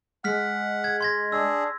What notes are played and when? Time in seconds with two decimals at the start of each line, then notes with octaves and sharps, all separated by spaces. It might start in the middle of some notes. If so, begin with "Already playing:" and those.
0.24 G#3 F#5 F6 B6
0.84 G#6
1.01 C6 G#6 A#6
1.32 D4 G#4 E6